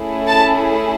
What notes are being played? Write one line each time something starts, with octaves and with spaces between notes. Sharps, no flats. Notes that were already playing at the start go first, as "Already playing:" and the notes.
Already playing: A3 C#4 E4 G#4
A5